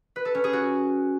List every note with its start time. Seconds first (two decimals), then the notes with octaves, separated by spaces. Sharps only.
0.16 B4
0.25 A4
0.35 C#4
0.44 G#4
0.53 F#4